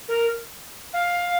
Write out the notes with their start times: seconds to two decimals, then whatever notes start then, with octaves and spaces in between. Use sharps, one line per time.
0.08 A#4
0.93 F5